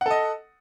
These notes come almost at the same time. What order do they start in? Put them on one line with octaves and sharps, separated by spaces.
F#5 A4 D#5